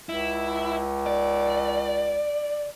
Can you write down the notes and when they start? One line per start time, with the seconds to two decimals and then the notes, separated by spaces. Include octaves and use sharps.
0.09 C#2 E4
1.06 D5